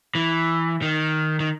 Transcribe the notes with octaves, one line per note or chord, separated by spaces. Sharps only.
E3
D#3
D#3